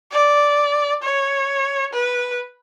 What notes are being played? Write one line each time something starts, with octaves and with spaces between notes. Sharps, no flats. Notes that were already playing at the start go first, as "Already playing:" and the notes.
D5
C#5
B4